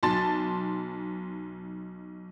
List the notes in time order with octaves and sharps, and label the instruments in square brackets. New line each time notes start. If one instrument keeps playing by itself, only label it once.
[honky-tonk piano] B1 A5 C6 A6